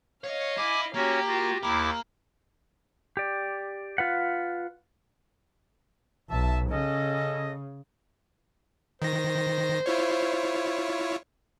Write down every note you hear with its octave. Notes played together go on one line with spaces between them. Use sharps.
C#5 D#5 F5
E4 G#5 D6
A#3 C#4 F#4 G4 C#5
F4 F#4
D#2 A#3 E4 D6
G4 D5
F4 B4 F#5
B1 E5 A5
C#3 C#4 A4 D#5
D#3 C5 A#6
E4 F4 C#5